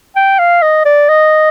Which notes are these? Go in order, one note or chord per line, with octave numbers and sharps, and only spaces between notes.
G5
F5
D#5
D5
D#5